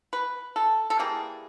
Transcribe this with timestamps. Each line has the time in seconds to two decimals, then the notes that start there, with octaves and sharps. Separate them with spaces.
0.13 B4
0.56 A4
0.90 A4
0.99 E3 G3 A#3 G#4